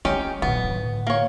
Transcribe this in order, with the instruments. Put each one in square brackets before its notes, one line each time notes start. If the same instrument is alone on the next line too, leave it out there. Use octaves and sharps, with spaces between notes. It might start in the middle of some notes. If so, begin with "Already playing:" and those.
[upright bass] G#3 [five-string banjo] C#4 D#4 G4
[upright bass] A#2 F#3 [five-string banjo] B3
[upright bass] A2 D3
[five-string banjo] A#3 C#5